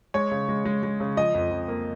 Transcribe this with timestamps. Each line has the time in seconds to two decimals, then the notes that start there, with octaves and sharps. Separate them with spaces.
0.14 G#3 C#5
0.31 C#3
0.49 G#3
0.65 G#3
0.83 G#3
1.00 C#3
1.17 F3 D#5
1.35 F2
1.51 F2
1.68 A#3